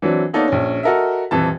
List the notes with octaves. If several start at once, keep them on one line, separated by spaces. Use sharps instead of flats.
E3 F#3 C4 D4
A#3 B3 D#4 A4 C#5 D5
A#1 C#4
F#4 A4 A#4 D#5 E5
D#1 F2 E3 A5